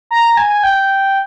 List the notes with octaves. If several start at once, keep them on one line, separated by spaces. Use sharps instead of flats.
A#5
G#5
G5